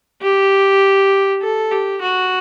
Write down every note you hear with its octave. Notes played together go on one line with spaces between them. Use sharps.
G4
A4
G4
F#4